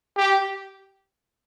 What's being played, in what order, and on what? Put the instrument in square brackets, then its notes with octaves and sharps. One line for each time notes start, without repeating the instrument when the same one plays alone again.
[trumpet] G4